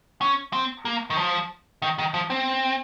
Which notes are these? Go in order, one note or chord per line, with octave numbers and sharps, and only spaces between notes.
C#4
C4
A#3
D#3
F3
D#3
D#3
F3
C4